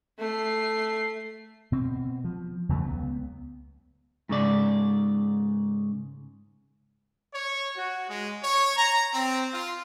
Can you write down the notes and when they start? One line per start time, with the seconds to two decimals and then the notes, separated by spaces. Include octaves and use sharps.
0.18 A3 C7
1.72 B2 C4
2.24 F3
2.69 E2 C#3 F#3 A3
2.86 C#2 B3
4.29 G#2 C#3 D5
7.33 C#5
7.76 F#4
8.09 G#3
8.43 C#5
8.77 A#5
9.14 C4
9.53 F4